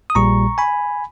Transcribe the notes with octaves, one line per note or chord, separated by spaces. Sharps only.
D#6
A#1 A#2 G3 A#5 C#6
G#5 B5